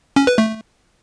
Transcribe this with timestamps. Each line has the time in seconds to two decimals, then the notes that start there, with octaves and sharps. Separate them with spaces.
0.16 C#4
0.27 B4
0.38 A3